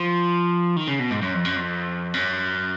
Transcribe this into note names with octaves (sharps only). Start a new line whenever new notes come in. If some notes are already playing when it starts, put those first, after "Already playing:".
Already playing: F3
D#3
C#3
B2
G#2
F#2
F2
F#2
F2
F#2